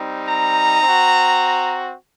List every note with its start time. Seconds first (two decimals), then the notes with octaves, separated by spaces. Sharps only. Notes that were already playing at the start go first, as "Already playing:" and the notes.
Already playing: G3 C4 D#4
0.27 A#5
0.82 C4 F#4